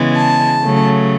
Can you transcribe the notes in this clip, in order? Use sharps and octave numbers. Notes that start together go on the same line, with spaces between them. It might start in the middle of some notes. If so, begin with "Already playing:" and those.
Already playing: C#3 E3 G#3 B3
A5
C#3 F#3 A3